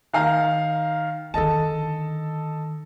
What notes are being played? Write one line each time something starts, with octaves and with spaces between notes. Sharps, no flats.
D#3 F5 A#5
D3 D#3 A4 D#5 A5